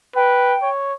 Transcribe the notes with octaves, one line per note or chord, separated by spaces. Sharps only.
B4 G5
C#5